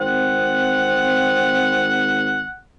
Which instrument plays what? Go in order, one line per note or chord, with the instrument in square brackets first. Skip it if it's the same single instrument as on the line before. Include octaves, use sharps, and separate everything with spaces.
[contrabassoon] G#1 [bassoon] C4 [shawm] F#5